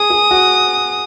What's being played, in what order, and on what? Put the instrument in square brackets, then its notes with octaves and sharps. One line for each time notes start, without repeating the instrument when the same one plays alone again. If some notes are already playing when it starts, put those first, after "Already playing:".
Already playing: [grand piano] G#4 [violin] D#6
[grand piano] G#4
F#4